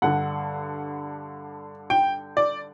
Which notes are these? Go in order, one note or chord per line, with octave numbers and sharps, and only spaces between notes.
G2 D3 F#5
G5
D5